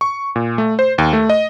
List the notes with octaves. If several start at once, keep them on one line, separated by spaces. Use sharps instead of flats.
C#6
A#2
A3
C5
D#2
A3
D#5